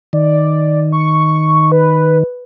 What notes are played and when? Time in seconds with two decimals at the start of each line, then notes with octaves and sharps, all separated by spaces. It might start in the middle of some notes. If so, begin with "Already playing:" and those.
0.13 D#3 D5
0.92 C#6
1.72 B4